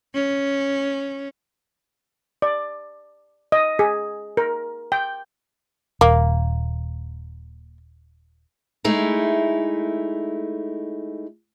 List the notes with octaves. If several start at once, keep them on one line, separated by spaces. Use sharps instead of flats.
C#4
D5
D#5
G#4
A#4
G5
D#1 A#3
G#3 A3 D#4 E4